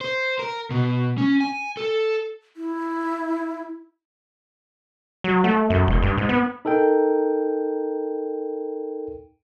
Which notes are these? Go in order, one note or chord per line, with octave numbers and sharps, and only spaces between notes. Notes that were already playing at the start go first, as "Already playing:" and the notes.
C5
A#4
B2
C#4
G#5
A4
E4
F#3
A3
F#2
E1
G2
G#2
B3
D#4 A4 A#4 G5